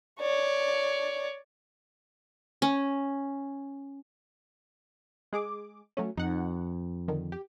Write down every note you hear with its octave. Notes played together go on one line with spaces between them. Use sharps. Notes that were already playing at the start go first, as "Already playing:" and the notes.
C#5 D5
C#4
G#3 G#4 D6
F#3 A3 C#4
F2 D#4 F#5
D3 D#3
G4